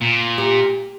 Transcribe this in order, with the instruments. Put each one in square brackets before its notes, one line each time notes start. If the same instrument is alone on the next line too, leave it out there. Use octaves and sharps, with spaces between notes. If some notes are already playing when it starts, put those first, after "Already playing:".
[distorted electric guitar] A#2
[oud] G4